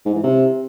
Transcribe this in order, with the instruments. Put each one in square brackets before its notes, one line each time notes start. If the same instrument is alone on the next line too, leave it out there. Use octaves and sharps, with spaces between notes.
[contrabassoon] G#2
E3
C3